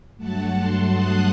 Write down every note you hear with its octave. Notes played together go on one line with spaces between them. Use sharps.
G2 F#3 A3 F#5 A5
A5 C6
D#6 F#6